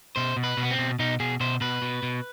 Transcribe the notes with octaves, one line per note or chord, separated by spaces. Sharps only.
B2 C5
B2
B4
B2
B3
C4
B2
B2 D#4
B2 G#4
B2 C5
B2 B4
B2
B2